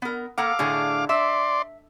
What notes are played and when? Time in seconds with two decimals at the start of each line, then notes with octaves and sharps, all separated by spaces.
0.02 B3 A#4
0.38 A#3 A4 F5 F#5 D6
0.59 A2 D3 G#4
1.09 D5 E5 C6